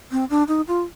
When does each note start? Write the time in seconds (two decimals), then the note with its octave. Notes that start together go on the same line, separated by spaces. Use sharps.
0.11 C4
0.30 D4
0.48 D#4
0.68 F4